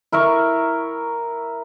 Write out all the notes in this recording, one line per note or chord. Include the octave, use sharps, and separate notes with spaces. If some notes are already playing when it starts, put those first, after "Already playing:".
E4 A#4 E5 C#6